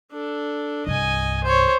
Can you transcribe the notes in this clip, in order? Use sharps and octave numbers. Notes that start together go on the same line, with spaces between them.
D4 A4
C2 G2 D#5 G#5
C5 C#5